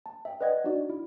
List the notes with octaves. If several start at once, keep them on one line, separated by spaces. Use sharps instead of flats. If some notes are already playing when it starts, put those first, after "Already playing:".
A5
E5 G5
B4 D5 D#5 F#5 G#6
D4 D#4 F#4 D5
E4